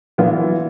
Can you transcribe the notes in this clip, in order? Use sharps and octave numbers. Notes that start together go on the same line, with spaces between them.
A#2 E3 F#3 B3 D4 F4